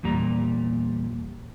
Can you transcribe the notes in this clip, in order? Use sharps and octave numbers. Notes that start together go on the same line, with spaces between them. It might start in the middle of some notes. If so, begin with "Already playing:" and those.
E2 A#2 G3 A#5